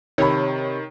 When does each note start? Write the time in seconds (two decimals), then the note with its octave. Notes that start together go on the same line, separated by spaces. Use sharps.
0.18 C3 D#3 C#5 B5